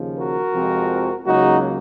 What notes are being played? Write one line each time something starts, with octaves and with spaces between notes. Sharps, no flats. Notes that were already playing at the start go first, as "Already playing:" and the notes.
Already playing: D#2 C#3 F3
F#4 A#4
F2 C3 F3 G#3 C4
C#2 C#3 F#3 A#3 D#4 F#4